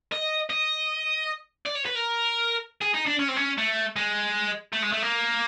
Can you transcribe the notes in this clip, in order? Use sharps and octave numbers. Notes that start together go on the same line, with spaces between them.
D#5
D#5
D5
C#5
B4
A#4
G#4
D#4
D4
C#4
C4
C#4
A3
G#3
A3
G#3
A3
A#3